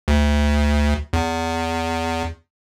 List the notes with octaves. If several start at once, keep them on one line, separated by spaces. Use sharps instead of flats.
D2
E2